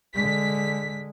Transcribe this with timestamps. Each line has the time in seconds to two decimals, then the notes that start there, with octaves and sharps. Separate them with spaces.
0.15 D3 G#3 B6